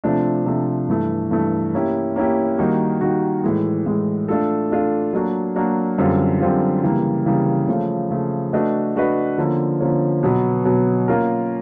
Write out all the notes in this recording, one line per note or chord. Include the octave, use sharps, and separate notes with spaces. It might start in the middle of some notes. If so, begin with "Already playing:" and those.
C3 F3 A3 D4
C3 F3 A3 D4
G2 E3 A3
G2 E3 A3
A#3 C#4 E4 G4
A#3 C#4 E4 G4
D#3 G3 A#3 D#4 F#4
D#3 G3 A#3 D#4 F#4
A2 E3 G#3
A2 E3 G#3
A3 D4 F4 A4
A3 D4 F4 A4
F#3 A#3 D4 F#4
F#3 A#3 D4 F#4
F#2 D3 G3 C4 F4
F#2 D3 G3 C4 F4
C#3 E3 G3 A#3
C#3 E3 G3 A#3
C#3 F3 A3
C#3 F3 A3
A3 D4 F#4 B4 D#5
A3 D4 F#4 B4 D#5
D3 F3 A#3 C#4
D3 F3 A#3 C#4
B2 F#3 B3
B2 F#3 B3
A#3 C#4 F4 A#4